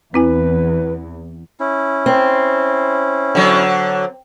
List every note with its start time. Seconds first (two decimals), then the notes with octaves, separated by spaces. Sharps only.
0.14 E2 C4 E4 B4 G#5
1.60 C#4 E4
2.06 C4
3.35 D3 F#3